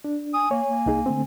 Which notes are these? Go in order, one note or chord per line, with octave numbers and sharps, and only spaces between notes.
D4
G#5 D#6
A#3 C#5
A#3
C2 D#4 G#4
D3 A3 C4